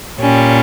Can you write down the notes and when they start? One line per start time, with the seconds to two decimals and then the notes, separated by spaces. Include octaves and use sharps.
0.20 A#2 G3 C#4